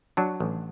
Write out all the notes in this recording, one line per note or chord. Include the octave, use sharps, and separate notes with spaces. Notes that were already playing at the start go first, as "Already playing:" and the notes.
F#3 D4
A1